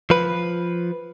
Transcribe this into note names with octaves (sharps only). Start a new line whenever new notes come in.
F3 B4